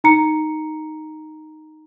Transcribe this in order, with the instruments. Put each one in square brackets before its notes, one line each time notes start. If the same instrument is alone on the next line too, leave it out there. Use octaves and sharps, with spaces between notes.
[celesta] D#4 A#5 C#7